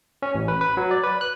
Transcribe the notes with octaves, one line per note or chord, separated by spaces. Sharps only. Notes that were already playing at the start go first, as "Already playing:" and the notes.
C#4
A1
B4
B4
F#3
D5
B4
F#6